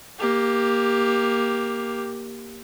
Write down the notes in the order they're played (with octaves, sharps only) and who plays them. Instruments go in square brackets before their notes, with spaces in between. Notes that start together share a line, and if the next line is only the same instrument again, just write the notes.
[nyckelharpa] A#3 G4